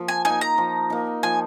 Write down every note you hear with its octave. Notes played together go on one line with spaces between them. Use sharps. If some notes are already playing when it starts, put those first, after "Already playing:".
Already playing: F3 A#3
G#5
D#4 G#5
A#3
A#5
F3
A#3 D#4
F3 G#5